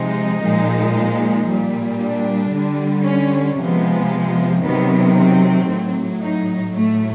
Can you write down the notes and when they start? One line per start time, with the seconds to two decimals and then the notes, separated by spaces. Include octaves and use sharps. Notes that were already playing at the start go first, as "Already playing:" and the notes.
Already playing: C3 F3 G#3 D#4
0.43 A#2 F3 G#3
1.48 A#2 G3
2.00 D4
2.52 D3 G3
3.05 C#4
3.57 C3 F3 G#3 B3
4.62 C3 D#3 F#3 B3
5.16 C4
5.67 A2 F#3
6.21 D#4
6.72 A2 F#3 A3